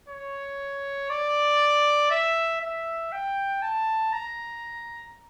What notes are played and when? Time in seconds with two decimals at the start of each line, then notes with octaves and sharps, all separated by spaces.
0.09 C#5
1.10 D5
2.11 E5
2.61 E5
3.12 G5
3.62 A5
4.12 A#5